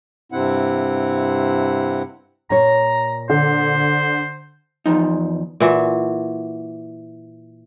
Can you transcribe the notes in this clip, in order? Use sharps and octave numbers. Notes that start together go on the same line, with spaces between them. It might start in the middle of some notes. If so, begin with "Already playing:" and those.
G2 C3 C4 E4 F#5
A#2 C#5 A#5
D3 C5
E2 F3 D#4
A#2 E3 F#4